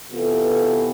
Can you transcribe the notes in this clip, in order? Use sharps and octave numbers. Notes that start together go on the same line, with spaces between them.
C3 E3 B3 F4 A4